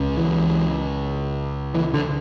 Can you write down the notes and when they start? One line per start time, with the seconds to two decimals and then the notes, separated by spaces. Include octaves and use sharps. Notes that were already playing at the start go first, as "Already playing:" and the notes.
Already playing: C#2 C#3
0.17 E3
1.75 E3
1.94 D3